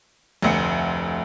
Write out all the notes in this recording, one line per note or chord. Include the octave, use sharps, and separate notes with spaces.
F1 D2 C#7